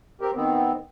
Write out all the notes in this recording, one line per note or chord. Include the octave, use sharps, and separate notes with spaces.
C4 G4 A#4
D#3 B3 C4